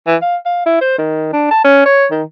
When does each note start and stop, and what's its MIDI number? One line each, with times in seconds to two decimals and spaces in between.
0.07 0.16 52
0.22 0.36 77
0.46 0.62 77
0.66 0.79 64
0.81 0.95 72
0.98 1.30 51
1.33 1.50 62
1.51 1.60 81
1.64 1.85 61
1.86 2.06 73
2.11 2.23 51